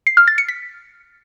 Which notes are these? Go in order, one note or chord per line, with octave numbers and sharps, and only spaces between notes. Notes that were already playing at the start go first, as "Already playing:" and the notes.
C7
F6
A6
C#7
B6